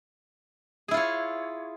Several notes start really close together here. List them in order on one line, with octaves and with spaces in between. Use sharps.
G#4 E4 F4 C#5